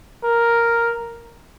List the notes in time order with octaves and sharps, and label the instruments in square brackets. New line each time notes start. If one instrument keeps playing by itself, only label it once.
[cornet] A#4